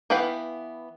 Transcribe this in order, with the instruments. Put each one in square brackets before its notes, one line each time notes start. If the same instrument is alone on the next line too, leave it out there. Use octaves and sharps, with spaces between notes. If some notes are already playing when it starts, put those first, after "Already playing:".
[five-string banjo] E3 B3 B4 F5 G5